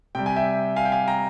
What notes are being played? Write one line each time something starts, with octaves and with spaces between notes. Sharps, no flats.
C3 G3 G5
G#5
E5 G5
F5 G#5
G5
F5 G#5
G5 A#5